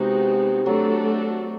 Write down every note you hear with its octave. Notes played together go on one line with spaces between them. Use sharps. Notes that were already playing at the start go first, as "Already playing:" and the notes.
Already playing: C3 G#3 B3 D#4 F#4
F#3 A3 D4 F#4 A4